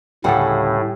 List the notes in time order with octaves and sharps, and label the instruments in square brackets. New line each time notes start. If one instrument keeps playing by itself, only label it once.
[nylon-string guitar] D2 C#3 F#5 [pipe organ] A2 [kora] G3 G#4 A4